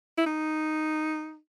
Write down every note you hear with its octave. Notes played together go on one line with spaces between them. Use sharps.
E4
D#4